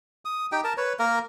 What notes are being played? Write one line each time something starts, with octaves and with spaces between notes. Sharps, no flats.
D#6
D#4 G4 G5
A#4 A5
B4 C#5
A#3 A#4